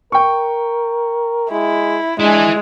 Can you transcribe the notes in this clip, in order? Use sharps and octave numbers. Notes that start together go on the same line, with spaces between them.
A#4 G5 C#6
G#3 E4
G#3 D4 E4 G#5